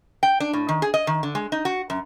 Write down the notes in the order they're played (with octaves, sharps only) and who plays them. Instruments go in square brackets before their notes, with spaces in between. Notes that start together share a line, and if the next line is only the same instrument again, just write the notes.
[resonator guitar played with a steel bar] G5
D4
A2
D#3
G#4
D#5
D#3
D3
G#3
D#4
F#4
F#2